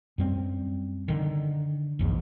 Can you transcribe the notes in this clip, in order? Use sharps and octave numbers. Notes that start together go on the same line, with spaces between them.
F#2 G3 C4
D3 D#3
A#1 E2 G#2